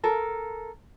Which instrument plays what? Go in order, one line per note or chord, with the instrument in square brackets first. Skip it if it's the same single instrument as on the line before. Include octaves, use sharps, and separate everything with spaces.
[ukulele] A4 A#4